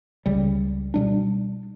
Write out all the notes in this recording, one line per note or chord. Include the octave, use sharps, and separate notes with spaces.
C#2 C#3 G3
B2 G3 D4